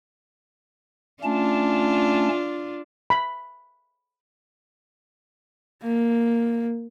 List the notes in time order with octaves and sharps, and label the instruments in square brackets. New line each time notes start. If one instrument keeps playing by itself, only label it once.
[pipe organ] A3 C#4 A5 [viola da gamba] D4 F4
[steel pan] B5
[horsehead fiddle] A#3